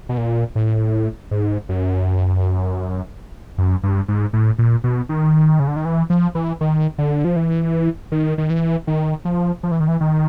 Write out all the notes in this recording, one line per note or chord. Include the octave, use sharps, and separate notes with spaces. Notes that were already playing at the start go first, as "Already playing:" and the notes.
B2
A#2
A2
G#2
F#2
F#2
G2
G#2
A2
A#2
B2
D#3
C#3
D3
D#3
E3
F3
E3
D#3
D3
F3
E3
D#3
D#3
E3
D#3
F3
F3
E3
D#3
E3
D#3